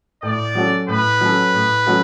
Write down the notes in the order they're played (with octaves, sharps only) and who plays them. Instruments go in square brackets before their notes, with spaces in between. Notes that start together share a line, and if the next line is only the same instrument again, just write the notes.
[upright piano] A2 [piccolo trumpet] D5
[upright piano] F#3 C#4 F#4 A4
[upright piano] A2 [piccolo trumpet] B4
[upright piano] F#3 C#4 F#4 A4
A2
F#3 C#4 F#4 A4